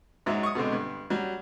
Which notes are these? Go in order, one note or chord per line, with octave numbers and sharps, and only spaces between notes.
G#2 F#3 G#3 E5
C#6 D#6
B2 D3 G#3 C4
G2
F#3 G3